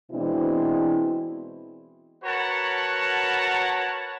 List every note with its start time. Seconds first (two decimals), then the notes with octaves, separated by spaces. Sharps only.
0.11 B2 E3 G#3 C4 D4 E4
2.24 F#4 A#4 B4 C#5 F#5 A5